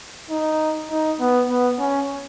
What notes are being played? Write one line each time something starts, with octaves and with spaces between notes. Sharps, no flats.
D#4
D#4
B3
B3
C#4